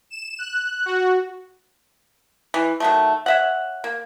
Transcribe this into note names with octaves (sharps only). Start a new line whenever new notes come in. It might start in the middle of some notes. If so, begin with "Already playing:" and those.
E7
F#6
F#4
E3
D#3 F#3 A3
C#5 E5 F#5
A#3